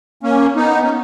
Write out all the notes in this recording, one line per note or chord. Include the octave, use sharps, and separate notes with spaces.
A#3 C#4
B3 D#4
C#4